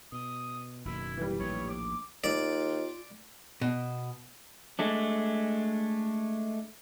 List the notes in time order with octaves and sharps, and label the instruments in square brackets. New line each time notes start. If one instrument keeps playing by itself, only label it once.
[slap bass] B2 [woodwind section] D#6
[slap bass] F#1 B2 D#3 [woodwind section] E4
[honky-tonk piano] E3 G3
[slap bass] A#1 D#2 A2 [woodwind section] C#5
[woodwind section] D6
[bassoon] D#2 [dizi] F4 [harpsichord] D5
[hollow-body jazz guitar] B2
[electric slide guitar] G#3 A3 D4